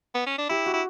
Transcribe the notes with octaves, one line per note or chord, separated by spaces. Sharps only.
B3
C#4
D4
E4 G4
F#4
E4